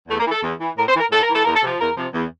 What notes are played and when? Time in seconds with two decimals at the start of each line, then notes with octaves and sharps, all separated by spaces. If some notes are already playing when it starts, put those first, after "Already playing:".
0.08 E2 A3
0.20 A#3
0.26 E3
0.31 A4
0.42 E2
0.59 E3
0.77 A2 A#4
0.89 C5
0.95 E3 A#4
1.11 A2 A4
1.22 A#4
1.29 E3 A4
1.45 E2 A#4
1.55 A4
1.62 C3 F3
1.79 E2 A#4
1.96 C3 F3
2.13 E2